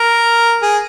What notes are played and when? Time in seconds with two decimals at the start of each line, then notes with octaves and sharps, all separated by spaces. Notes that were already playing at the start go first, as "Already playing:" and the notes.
Already playing: A#4
0.62 G#4